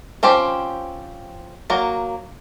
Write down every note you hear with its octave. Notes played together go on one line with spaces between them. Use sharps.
F3 C4 C#4 G4
F#3 A#3